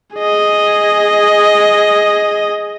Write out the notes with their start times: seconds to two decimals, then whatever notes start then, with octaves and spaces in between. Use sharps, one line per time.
0.15 G#4 D#5